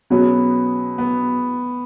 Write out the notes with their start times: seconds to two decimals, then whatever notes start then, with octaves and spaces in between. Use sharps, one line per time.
0.10 B2 F#3 B3 C#4 G#4
0.98 B3